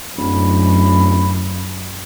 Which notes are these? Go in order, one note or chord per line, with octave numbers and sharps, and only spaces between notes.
D1 F#2 B5